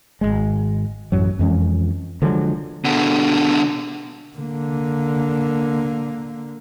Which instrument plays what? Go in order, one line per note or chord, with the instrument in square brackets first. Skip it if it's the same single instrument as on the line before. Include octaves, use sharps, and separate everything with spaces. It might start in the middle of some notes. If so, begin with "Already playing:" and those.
[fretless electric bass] G#1 D#2 G#3
A1 F#2 F#3
F2 E3 G#3 C#4
D3 F3 F#3 G#3
[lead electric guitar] B2 D3
[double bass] D3 A#3